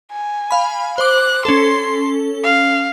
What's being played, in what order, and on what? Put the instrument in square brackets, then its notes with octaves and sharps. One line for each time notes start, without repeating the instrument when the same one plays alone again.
[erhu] G#5
[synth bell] F5 B5
[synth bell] C5 D6 [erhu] F#6
[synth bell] C#4 A4 [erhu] C6
[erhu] F5